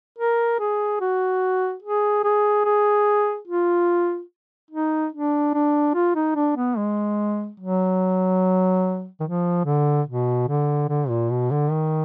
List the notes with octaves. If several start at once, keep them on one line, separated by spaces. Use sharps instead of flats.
A#4
G#4
F#4
G#4
G#4
G#4
F4
D#4
D4
D4
F4
D#4
D4
B3
G#3
F#3
D#3
F3
D3
B2
D3
D3
A#2
B2
D3
D#3